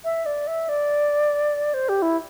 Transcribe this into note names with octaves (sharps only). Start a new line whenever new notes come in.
E5
D5
E5
D5
C5
G4
E4